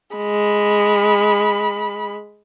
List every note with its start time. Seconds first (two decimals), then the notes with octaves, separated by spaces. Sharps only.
0.17 G#3 B5